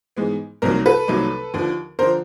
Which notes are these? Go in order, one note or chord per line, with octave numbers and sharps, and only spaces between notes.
G#2 E3 G#3 B3
C2 C3 D#3 F#3 A#3 A#4
A4 B4
C2 C3 D#3 F#3 A#3
D#2 D3 F3
D3 F3 A#4 C5